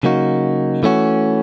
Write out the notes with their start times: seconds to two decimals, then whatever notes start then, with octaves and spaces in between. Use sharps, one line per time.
0.03 C#3 F#3 A#3 D#4 F#4
0.83 E3 A3 C#4 F#4